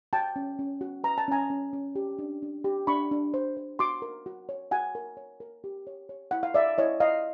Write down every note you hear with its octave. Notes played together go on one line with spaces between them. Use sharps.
F#4 G5 A5
C#4
C#4
F#4
B4 A#5
A5
C#4 G#5 A#5
C#4
C#4
G4
D4
D4
G4
D4 B5 C#6
D4
C5
C5
F#4 C6 D6
A#4
F#4
C#5
F#4 F#5 G#5
A#4
C#5
A#4
G4
C#5
C#5
E4 F#5
F5
C#5 D5 E5
E4 C#5 D#5
C#5 D#5 F5